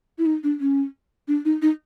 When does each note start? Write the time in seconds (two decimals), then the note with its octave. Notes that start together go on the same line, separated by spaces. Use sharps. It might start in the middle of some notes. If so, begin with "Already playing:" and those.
0.18 E4
0.26 D#4
0.44 D4
0.60 C#4
1.28 D4
1.45 D#4
1.62 D#4